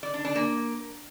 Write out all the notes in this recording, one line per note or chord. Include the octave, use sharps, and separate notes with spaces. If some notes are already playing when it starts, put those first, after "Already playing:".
D5
D4
D4
A#3